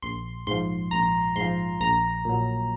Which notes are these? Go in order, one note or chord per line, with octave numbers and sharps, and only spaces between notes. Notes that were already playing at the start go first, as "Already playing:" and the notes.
A#1 C6
G#2 F3 C6
A#1 A#5
G#2 C6
F3
A#1 A#5
A#2 F#3